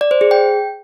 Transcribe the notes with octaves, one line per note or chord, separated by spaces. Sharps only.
D5
C5
G#4
G5